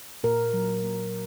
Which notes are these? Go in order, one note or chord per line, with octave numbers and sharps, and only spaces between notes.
A#2 A#4
F#3
A#3